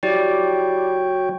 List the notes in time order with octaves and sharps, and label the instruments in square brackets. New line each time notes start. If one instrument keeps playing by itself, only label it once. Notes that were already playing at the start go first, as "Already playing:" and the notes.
[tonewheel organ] F#3 C#5 G5 [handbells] E4 G4 D5